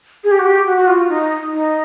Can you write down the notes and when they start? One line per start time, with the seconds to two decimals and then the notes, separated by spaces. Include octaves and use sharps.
0.24 G#4
0.31 G4
0.39 F#4
0.46 G4
0.67 F#4
0.78 F#4
0.87 F4
1.09 D#4
1.52 D#4